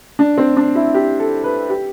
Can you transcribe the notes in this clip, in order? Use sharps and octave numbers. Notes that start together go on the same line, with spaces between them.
D4
C4
D4
E4
G4
A4
B4
G4